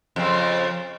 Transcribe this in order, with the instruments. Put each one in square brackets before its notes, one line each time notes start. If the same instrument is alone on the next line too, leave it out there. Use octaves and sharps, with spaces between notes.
[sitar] F2 C#3 C4